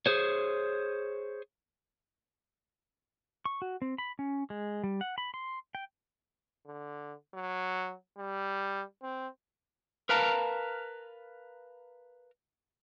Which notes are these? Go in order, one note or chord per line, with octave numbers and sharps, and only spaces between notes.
G#4 C5 C#5
C#6
F#4
C4
B5
C#4
G#3
G3
F#5
B5
C6
G5
D3
F#3
G3
C4
A#4 B4 F5 A5 A#5